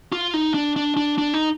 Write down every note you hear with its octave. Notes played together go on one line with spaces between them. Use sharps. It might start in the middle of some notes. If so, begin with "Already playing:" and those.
F4
D#4
D4
D4
D4
D4
D#4